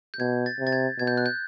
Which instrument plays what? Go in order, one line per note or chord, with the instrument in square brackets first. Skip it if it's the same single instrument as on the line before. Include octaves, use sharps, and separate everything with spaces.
[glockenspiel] G6
[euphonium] B2 [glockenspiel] G#6
[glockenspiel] A6
[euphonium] C3
[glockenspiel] A6
G#6
[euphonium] B2 [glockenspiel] G#6
[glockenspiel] G6
F#6
G6